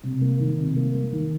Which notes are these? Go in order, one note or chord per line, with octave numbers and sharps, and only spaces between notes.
C3
A#3
D#3
C3
A#3
A#3
D#3